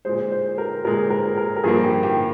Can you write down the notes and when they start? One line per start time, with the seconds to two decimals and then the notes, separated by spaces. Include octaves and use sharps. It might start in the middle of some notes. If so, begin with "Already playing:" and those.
0.05 A#2 G#3 C5
0.32 C5
0.58 A#4
0.85 A#2 G#3 A#4
1.10 A#4
1.37 A#4
1.56 A#4
1.64 G2 F3 A#3 G#4
1.84 G4
2.03 G4